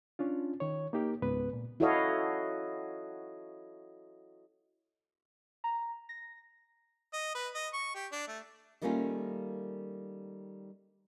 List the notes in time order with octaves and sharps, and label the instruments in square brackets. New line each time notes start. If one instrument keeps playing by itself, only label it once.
[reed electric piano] C#4 D4 F4
D#3 C#5
A#3 D#4 G4 A#4
C#2 G#2 B3 B4
A#2
[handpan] E4 F#4 A4 C#5 D#5 F5
[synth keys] A#5
A#6
[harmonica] D#5
B4
D#5
C#6
G4
D4
A3
[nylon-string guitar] D#3 G3 A3 A#3 C#4 F4